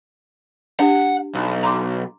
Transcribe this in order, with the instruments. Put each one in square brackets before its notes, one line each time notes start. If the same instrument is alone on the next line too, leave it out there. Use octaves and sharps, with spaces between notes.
[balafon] D4 G4 [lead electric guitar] F#5
[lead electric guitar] B1
[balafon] A#5 C6 D6